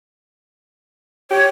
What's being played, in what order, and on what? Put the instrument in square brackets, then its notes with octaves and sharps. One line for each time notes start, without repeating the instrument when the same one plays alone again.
[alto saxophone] G4 [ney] C#5